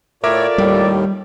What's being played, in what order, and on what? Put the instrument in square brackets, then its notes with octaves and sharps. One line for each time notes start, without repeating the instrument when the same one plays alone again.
[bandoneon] A2 C#5 [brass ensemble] F4 A4 D5 [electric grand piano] A#4 E5 D6
[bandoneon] D#2 A2 D#3 [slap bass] G3